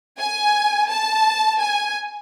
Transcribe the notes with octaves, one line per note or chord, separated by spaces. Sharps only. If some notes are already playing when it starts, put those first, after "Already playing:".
G#5
A5
G#5